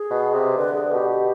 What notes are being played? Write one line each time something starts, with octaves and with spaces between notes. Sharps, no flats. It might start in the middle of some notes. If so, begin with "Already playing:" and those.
Already playing: G#4
B2
C3
D3 B4
G#4
B2 G4
G4